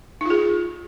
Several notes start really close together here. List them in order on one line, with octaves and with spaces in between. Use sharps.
D#4 F4 G#4